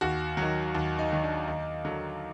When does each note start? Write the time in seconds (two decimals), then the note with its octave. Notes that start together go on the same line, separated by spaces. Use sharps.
0.01 D#2 F#4
0.37 D#3 F#3
0.75 D#2
0.99 D#4
1.12 D#3 F#3
1.23 D4
1.47 D#2 D#4
1.85 D3 F#3